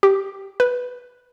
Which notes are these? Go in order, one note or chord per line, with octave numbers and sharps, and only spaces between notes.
G4
B4